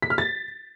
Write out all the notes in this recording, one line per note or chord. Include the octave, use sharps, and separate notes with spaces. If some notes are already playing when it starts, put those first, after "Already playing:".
B6
F6
A6